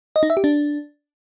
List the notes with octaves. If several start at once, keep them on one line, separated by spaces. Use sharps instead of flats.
D#5
D#4
E5
G4
D4